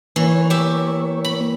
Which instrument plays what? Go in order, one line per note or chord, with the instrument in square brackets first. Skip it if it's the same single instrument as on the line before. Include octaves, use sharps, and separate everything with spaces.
[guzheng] E3 [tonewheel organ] A#3 C#5
[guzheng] G4 E5
B5